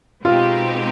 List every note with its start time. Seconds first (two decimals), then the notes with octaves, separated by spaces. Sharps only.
0.24 B2 G#3 C4 D#4 F4 G4